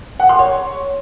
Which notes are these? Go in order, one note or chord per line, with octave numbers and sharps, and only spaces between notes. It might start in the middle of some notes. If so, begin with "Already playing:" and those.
F#5
C6
C#5